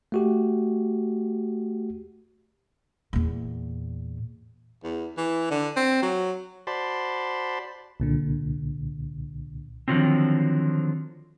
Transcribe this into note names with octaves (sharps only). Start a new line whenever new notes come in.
A3 F#4 G4
E2 A#2
E2
E3
D3
C4
F#3
F#4 C5 D5 A5 B5 C6
C2 A#2 D3
D3 D#3 F3 F#3 C4